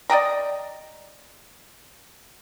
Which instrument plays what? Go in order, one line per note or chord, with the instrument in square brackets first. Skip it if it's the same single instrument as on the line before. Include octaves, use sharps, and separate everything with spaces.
[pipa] D5 D#5 G5 A#5